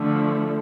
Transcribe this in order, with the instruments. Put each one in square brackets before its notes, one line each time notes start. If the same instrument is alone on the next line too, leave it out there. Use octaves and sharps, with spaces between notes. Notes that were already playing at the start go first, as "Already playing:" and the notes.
Already playing: [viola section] D3 F3 A3